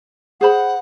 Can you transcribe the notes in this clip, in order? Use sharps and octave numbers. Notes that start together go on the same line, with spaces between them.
G#4 C5 F#5 B5